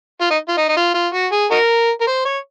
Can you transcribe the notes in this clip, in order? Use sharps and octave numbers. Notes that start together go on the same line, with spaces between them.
F4
D#4
F4
D#4
D#4
F4
F4
F#4
G#4
D#4 F#4 A#4
A#4
C5
C#5